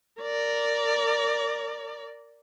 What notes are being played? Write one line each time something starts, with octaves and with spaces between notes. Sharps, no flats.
A#4 D5